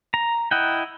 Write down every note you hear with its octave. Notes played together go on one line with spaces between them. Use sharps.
A#5
E4 D#5 F#5 G5